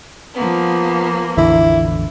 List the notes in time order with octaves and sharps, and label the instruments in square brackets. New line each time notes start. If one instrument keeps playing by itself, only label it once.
[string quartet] F3 A#3 B3
[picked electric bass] A1 E2 D3 [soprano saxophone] E4